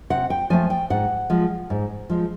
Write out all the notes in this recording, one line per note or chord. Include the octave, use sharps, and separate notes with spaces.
C3 F#5
G5
F3 A3 G#5
G5
G#2 F#5
F3 G#3
G#2
F3 G#3